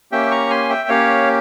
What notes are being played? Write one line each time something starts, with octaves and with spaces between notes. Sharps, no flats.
A#3 C#4 G4 E5 G5
A#5 C#6
G#5 C6
E5 G5
A#3 C#4 G4 C#5 F5